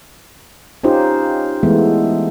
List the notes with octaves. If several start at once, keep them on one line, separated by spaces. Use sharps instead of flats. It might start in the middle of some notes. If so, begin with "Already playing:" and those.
C#4 D#4 F4 G4 C5
E3 G#3 A3 B3